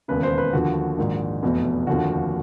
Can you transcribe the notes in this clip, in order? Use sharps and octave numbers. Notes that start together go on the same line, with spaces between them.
E1 D#2 C#3 B4
C5
B4
D#2 D3 F3 F#4
A#1 G#2 D#3
F1 E2 B2
F1 D#2 D3 F3 F#4